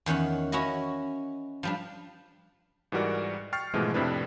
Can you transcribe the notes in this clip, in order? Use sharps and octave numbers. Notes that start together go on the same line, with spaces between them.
E2 D#3 C#4 F#5
C#4 E4 F#4 D#5
F3 G3 D4
G#2 E3 G3 F#4 A#4 D5
G5 C#6 F6 A6 C7
G#2 B2 E3 F3 G#3 A3
F2 A2 C3 D4 E4 B4